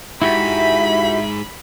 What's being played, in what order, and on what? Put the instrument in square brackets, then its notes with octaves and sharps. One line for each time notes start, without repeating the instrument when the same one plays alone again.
[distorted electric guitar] G#2 [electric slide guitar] E4 F#4 G4 [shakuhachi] E5 [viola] B5